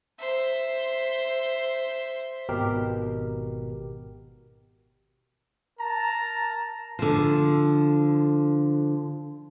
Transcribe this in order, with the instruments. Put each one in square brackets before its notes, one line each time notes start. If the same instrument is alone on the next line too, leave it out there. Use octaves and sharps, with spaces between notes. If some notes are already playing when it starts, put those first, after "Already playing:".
[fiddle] C5 E5
[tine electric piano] G#1 B2 G4 A#4
[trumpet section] A#4 A5 A#5
[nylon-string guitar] D3 F3